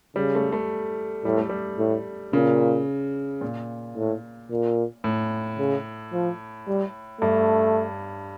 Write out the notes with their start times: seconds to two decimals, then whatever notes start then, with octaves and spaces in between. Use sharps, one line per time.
0.16 C#3 G3
0.35 A3
0.52 A3
1.24 A2 G3
1.38 A3
1.49 G3
1.79 A2
2.33 A#2 C#3
3.41 A#2
3.97 A2
4.51 A#2
5.04 A2
5.59 C#3
6.13 F3
6.67 G3
7.21 G2 A3